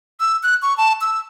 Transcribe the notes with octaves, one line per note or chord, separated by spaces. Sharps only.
E6
F#6
C#6
A5
E6